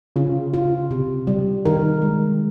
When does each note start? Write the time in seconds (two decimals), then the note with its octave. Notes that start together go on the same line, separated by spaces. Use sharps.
0.16 C#3 F4
0.54 F4
0.91 C3
1.27 G3
1.65 D#3 A#4
2.02 G#3